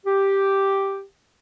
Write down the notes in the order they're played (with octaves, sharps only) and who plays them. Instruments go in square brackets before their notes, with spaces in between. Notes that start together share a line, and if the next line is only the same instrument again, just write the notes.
[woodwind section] G4